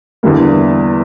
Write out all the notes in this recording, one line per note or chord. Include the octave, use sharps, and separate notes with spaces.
E2 D3 G3 A#3